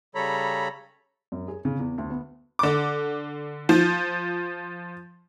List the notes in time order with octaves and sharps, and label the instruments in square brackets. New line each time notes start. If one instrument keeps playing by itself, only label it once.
[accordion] C#3 G3 A4 C#5 A#5 B5
[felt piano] F#2
G#4
C#3
E2
D2
B3
[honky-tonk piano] D3 D6
F3